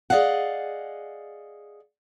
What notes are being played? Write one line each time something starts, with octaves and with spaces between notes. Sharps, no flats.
G#4 D5 D#5 F5 F#5